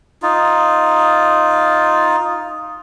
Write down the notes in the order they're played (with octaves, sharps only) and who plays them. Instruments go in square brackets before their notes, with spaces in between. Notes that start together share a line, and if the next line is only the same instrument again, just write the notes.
[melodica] D#4 F4